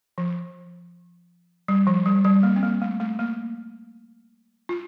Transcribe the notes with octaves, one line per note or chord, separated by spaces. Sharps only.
F3
G3
F3
G3
G3
A#3
C4
A#3
A3
A3
A#3
F4